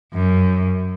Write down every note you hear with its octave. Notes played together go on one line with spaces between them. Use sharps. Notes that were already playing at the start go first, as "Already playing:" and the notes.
F#2